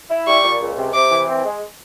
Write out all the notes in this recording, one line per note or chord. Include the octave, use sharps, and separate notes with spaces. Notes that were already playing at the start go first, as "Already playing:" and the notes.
E4
G3 C#6
A#2
C#2
C3
C3 D6
E3
C4
G#3